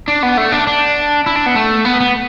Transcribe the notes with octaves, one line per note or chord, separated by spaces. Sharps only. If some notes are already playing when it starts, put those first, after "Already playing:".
D4
B3
A3
D4
D4
E4
D4
B3
A3
B3
B3